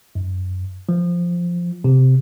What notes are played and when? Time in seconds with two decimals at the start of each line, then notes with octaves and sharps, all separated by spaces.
0.15 F#2
0.89 F3
1.84 C3